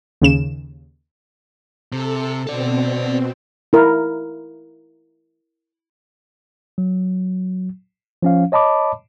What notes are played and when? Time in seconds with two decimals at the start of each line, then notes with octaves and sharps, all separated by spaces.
0.21 D#2 C#3 E7
1.92 C3 A4
2.47 B2 C4 A4 D5
3.73 E4 A#4
6.78 F#3
8.23 F3 C#4 F5
8.52 C#5 D#5 A5 B5 D6